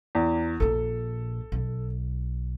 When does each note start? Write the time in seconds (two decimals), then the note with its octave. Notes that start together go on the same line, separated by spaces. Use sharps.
0.15 E2
0.60 A#1 A#2 A4
1.52 B1